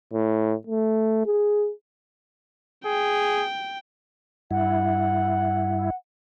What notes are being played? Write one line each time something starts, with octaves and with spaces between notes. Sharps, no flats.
A2
A3
G#4
G#4 G5
G2 E4 F#5